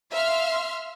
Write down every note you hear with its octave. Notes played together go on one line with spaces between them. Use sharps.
E5 F5 C6 F6